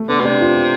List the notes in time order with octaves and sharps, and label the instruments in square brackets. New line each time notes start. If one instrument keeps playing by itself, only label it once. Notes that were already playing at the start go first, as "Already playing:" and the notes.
Already playing: [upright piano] A3
[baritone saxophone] D3 [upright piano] B3
[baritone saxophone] B2
[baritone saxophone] C3 [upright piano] D4
[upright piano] F4